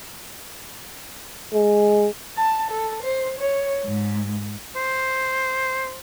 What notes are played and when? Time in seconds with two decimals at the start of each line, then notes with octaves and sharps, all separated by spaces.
1.54 G#3
2.36 A5
2.70 A4
3.02 C5
3.38 C#5
3.84 G#2
4.76 C5